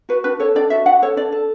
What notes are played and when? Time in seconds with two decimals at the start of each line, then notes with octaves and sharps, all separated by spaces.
0.09 F#4 B4
0.24 D4 B4
0.39 A4 C#5
0.55 D4 D5
0.70 F#4 E5
0.86 D4 F#5
1.02 A4 C#5
1.17 D4 D5
1.32 A4